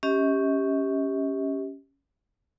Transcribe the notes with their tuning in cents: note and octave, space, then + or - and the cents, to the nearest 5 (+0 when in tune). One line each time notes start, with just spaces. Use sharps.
C#4 +0 G4 +0 D#5 +45